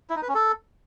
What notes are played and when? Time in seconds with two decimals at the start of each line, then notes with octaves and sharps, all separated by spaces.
0.10 E4
0.16 D#4
0.22 B4
0.29 C#4
0.35 A4